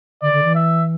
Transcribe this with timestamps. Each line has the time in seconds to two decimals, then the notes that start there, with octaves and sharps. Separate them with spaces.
0.22 D3 D5
0.33 D3
0.44 E3
0.55 E5